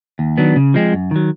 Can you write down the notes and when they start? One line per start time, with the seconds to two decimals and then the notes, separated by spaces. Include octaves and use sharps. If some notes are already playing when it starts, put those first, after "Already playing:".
0.19 D#2
0.38 D#3 F#3 B3 D4
0.56 C#3
0.74 F3 G#3 C4
0.93 F#2
1.11 D#3 F#3